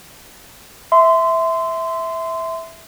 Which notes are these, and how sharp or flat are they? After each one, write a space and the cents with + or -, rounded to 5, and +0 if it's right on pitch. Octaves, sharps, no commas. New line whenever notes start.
E5 -10 C6 -20